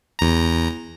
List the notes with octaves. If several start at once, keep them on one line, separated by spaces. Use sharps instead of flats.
E2 A#5